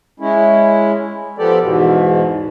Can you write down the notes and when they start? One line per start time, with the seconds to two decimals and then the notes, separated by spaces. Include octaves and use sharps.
0.20 G#3 C#4 E4
1.39 F3 B3 G4 A4 D5
1.62 E2 G#2 B2